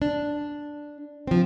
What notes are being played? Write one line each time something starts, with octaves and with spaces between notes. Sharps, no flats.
D4
F3 C4